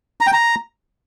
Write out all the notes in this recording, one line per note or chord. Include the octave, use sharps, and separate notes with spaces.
A#5
G5
A#5